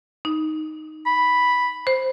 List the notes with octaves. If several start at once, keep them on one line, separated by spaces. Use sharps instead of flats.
D#4
B5
C5